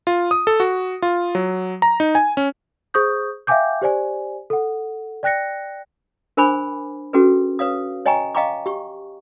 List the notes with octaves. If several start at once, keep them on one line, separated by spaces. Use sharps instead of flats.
F4
D#6
A4
F#4
F4
F#3
A#5
D#4
G#5
C#4
G#4 C5 C#6 D#6 G6
E5 F5 G5 G#5 D6 G6
G4 C5 D5 G#5
A4 F#5
D5 G5 F#6 A#6 C#7
D4 A#4 C5 G#5 B5 D6
C#4 F#4 G#4 A4 B4
B4 C#5 F5 D#6
C#5 D#5 G5 G#5 A#5 C#6
D#5 F5 G5 A#5 C#6 D6
G4 C#6